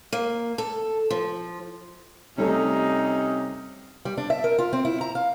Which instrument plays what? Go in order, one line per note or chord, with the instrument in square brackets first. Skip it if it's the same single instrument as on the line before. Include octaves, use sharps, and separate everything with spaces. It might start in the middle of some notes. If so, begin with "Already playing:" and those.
[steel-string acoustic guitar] A#3
A4
F3
[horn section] C3 C#4 D#4 [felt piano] G3 A3 A4
[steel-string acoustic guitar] G3
D4
E5
A#4
F4
C4
E4
A#5
F5